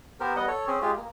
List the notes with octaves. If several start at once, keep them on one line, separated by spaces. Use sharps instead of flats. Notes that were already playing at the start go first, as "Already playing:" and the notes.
B3 G4 A#4 C5
G3 B3 D#5 F#5
A4 C#5
C4 C#4 G#4
G#3 F4 G4 G#4
A#3